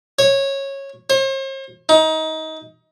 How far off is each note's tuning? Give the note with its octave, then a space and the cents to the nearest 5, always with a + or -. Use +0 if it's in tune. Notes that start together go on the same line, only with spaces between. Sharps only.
C#5 -15
C5 +45
D#4 +25